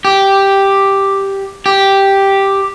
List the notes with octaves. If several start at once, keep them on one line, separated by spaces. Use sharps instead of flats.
G4
G4